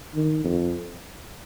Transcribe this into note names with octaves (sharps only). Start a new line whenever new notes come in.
D#3
F2